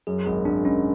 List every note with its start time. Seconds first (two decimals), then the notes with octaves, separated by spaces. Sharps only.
0.07 F#2 G#4
0.26 G#1 G#4
0.45 G#1 D4
0.65 G#1 C#4